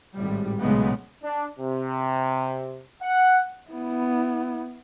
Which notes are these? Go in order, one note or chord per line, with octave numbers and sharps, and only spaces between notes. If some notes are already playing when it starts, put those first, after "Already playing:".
G#1 A2 G3
B1 A#2 C#3 G#3 A3 B3
D4
C3
F#5
B3 E4